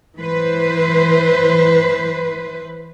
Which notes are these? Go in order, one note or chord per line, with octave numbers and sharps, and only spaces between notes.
E3 B4 C5